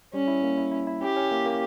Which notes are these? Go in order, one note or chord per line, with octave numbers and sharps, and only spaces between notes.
G3 C#4
E4
A#3
E4
E4
E4
C#4 G4
C#4
A#3
A#3